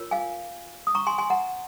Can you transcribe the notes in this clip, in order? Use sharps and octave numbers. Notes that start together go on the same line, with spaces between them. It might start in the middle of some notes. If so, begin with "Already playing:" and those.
Already playing: F4 A#4 C#5
F5 G#5
D#6
A#5 C#6
G#5 C6
G#5 C6
F#5 A#5